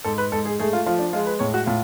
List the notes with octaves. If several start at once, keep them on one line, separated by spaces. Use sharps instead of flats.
G#2 A4
B4
G#2 A4
G#4
A3 G#4
F4
F3 F4
D4
G#3 F4
B4
A2 C#5
F#4
A2 F4